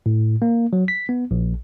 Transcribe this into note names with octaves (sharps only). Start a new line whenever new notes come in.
A2
A#3
F#3
B6
B3
A#1